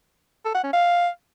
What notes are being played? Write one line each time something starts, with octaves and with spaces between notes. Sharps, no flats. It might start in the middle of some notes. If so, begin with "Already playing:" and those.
A4
F#5
C#4
F5